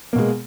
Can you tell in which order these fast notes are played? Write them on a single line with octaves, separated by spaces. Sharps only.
A#3 B2 G#3